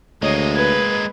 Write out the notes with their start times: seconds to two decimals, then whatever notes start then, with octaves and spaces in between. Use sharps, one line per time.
0.22 D2 G#3 A#3 C#5 D#5
0.56 B4 G#6